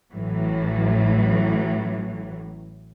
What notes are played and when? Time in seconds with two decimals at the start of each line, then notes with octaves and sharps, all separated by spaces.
0.13 A1 A2 E3 F#3